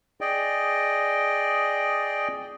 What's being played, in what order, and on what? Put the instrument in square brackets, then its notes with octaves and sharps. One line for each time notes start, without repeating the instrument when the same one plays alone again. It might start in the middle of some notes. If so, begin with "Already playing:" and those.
[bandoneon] G#4 D5 D#5 G5